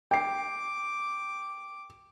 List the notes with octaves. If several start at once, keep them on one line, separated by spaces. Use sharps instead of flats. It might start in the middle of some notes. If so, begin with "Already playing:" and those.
G5 D6 C7